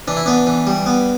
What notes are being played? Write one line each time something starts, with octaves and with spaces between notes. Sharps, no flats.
E3 D4
E4
B3 D4
E3
G3
B3